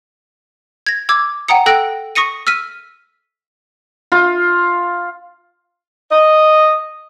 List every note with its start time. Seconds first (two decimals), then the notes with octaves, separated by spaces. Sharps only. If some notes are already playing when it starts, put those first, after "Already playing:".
0.87 G#6 A#6
1.09 D6 E6 G#6
1.48 F#5 G5 A#5 D#6 C#7
1.66 A4 G5 E6 F#6 A#6 D7
2.15 C#6 D#6 A#6 C#7 D#7
2.47 E6 F6 B6 D#7
4.12 F4
6.11 D#5